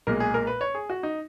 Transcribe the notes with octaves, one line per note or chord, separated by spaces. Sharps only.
B1 A#2 G#3 A#4
G#4
A#4
B4
C#5
G#4
F#4
D#4